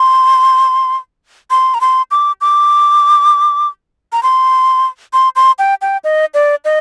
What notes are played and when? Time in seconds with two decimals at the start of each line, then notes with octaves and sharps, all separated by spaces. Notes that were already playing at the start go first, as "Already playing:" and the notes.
Already playing: C6
1.50 C6
1.74 A#5
1.81 C6
2.11 D6
2.41 D6
4.13 A#5
4.23 C6
5.13 C6
5.36 C6
5.59 G5
5.82 G5
6.04 D#5
6.34 D5
6.65 D#5